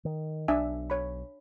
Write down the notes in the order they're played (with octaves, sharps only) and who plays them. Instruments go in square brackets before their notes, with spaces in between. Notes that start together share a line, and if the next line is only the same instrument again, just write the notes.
[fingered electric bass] D#3
[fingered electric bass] B1 [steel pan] D4 E5 G#5
[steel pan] C#5 B5